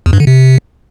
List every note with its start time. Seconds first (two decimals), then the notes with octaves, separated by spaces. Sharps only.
0.06 E2
0.13 G2
0.20 D3
0.27 C3